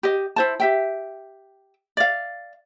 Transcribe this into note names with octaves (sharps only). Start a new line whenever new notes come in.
G4 D#5
E4 C5 A5
G4 E5 G5
D5 F5